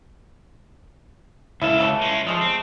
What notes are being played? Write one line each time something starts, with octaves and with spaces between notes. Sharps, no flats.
C#2 E4 A4 F5
C#3 E3 A3
G#3 C#4
F3 G#3 A3 D#5
C4